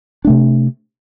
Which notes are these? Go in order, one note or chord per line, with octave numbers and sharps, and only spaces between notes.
C3 A3 D4